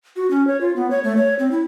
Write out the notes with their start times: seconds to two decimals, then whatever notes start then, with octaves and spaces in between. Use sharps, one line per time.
0.16 F#4
0.30 C#4
0.47 C#5
0.61 F4
0.76 B3
0.90 C#5
1.04 A3
1.17 C#5
1.39 C4
1.51 E4